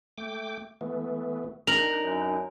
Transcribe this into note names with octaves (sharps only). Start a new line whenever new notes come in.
A3 G5 D6
E3 A3 B3
D4 D#4 A#4 F7 F#7
F#2